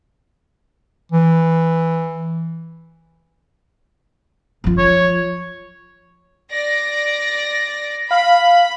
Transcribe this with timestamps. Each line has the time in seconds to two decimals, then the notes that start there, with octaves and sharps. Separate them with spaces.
1.12 E3
4.64 F3 F4
4.78 C#5
6.51 D5 A#6
8.11 F5 B5